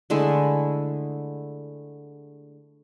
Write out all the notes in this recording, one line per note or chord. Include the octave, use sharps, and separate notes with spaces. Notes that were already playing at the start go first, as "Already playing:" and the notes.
D3 G#3 A3 E4